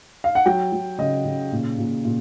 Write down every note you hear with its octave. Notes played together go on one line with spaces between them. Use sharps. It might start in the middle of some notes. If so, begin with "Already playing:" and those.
F5
F#5
F#3 G5
F#3
C#3 D#5
C#3
A#2
A#2
A#2